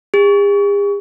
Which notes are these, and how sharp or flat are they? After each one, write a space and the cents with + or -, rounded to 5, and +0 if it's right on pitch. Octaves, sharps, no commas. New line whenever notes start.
G#4 -45